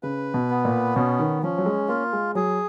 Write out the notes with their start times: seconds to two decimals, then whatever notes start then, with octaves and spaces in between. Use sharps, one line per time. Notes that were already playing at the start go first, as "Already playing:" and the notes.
0.03 C#3 B4
0.34 B2
0.50 B3
0.65 A#2
0.96 B2 C#4
1.19 D#3
1.43 F3 C#4
1.58 F#3
1.66 G#3
1.89 A#3 F4
2.13 G#3
2.35 F#3 G#4